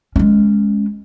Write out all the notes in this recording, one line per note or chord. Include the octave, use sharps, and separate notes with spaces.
G#3 C#4